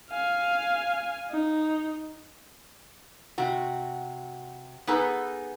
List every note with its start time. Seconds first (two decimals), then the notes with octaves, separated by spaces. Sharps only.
0.11 F5 G#5
1.30 D#4
3.38 C3 F#4
4.87 B3 D#4 G#4 A4 B4